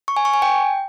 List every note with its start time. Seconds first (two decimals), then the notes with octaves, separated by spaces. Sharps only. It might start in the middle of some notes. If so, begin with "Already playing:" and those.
0.08 C#6
0.17 G#5
0.25 C#6
0.34 G#5
0.42 G5